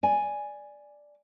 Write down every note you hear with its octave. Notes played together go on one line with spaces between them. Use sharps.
D5 G#5